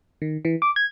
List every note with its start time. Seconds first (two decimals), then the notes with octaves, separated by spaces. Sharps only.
0.22 D#3
0.45 E3
0.62 D6
0.76 G#6